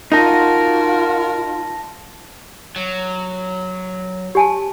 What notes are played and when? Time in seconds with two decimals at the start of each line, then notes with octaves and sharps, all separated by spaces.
0.12 D#4 F4 F#4 A#4 A5 A#6
2.76 F#3
4.35 G4 G#5 A5